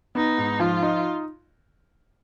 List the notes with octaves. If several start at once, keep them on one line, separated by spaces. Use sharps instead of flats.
B3 D#4
G#2
F3 F4
D#4